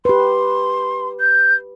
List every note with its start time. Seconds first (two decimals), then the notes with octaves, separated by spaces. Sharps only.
0.05 G4 B4 C6
1.20 G6